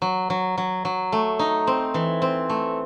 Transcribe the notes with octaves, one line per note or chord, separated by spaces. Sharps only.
F#3
F#3
F#3
F#3
A3
D#4
C4
E3
C4
A3